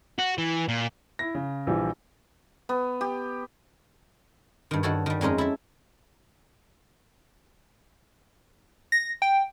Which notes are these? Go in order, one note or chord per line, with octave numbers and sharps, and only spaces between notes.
F#4
E3
A#2
E4 A#6
C#3
A#1 E3 F3 G3
B3
G4
G2 D#3
G2 D#3 F#4 A4 C#5
D#3 G3
F2 G#3 C#4 D#4 A#4
E4 A4 E5
A#6
G5